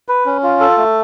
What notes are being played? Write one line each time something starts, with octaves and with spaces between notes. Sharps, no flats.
B4
C#4
F4
A4
A3